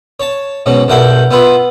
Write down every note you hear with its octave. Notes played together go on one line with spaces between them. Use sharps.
C#5 A5
G#2 B2 F#3 C#4
B1 G2 E4 A#4 F#5 G5
B3 E4 F4 B4